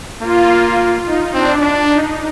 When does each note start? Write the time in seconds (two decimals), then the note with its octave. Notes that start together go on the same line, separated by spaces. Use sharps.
0.21 A#3 F4
1.06 D#4
1.34 C4 D4
1.62 D4
1.90 D#4